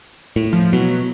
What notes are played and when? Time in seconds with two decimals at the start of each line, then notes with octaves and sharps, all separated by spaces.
0.36 A2
0.53 F3
0.73 B2 F#3